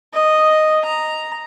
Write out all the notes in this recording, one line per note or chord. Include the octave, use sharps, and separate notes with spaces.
D#5
A#5